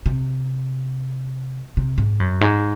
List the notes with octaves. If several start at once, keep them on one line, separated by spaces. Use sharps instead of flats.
C3
C3
G#2
F#2
G#2